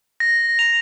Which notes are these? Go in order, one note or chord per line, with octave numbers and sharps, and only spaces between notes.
A#6
F7